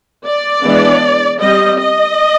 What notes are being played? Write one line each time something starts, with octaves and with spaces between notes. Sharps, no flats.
D5
E3 G#3 B3 D4
G3 C4 D#5
D#5